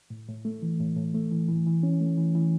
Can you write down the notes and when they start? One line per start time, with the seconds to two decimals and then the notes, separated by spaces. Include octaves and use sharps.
0.10 A2
0.28 A2
0.45 A3
0.62 E3
0.80 A2
0.96 A2
1.14 A3
1.31 E3
1.48 E3
1.66 E3
1.83 C#4
2.00 A3
2.17 E3
2.35 E3